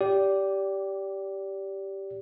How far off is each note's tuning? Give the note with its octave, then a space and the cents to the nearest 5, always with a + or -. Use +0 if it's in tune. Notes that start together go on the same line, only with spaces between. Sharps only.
G4 -5 D5 -25